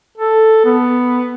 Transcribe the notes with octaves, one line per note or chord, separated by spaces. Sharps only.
A4
B3